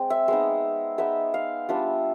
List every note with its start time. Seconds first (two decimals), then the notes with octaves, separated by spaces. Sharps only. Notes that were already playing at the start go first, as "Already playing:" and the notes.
Already playing: G#3 C4
0.10 E5
0.28 G#3 B3 D#4
0.98 G#3 B3 D#4 E5
1.34 F5
1.69 G3 B3 D4 F4 E5